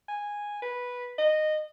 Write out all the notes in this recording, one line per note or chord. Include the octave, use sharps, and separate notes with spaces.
G#5
B4
D#5